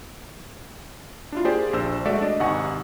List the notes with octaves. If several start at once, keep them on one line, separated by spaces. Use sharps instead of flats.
D4 E4 F4
A#3 G4 G#4 C5 D5
A#1 D4 C5 E6 E7
G#3 A3 F#4 A4 D5 E5
D4 D5 D#5
G#1 C3 D#4 F#5 G#5 C#6